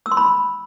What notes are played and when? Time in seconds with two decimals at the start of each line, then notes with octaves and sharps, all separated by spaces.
0.06 E6
0.11 C6
0.17 B5